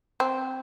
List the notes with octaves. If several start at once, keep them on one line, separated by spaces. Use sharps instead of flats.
C4